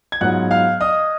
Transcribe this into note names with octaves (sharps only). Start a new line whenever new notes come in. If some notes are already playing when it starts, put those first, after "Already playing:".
G#6
G#2 F#3 B3 F4 F#5 F#6
F5 F6
D#5 D#6